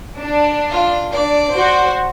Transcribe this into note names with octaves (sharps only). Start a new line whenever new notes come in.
D4
F4
D4 D5
F#4 C5